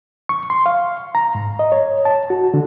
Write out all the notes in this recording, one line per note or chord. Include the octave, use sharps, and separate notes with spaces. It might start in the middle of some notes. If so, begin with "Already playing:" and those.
C#6
C6
F5
A#5
G#2
D#5
C#5
A5
F#4
D3